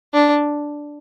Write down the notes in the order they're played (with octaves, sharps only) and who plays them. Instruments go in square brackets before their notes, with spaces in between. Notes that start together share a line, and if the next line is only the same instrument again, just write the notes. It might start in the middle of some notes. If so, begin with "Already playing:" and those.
[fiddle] D4